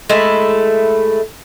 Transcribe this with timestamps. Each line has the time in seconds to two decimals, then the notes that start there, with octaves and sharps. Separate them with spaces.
0.10 G#3 A3 E4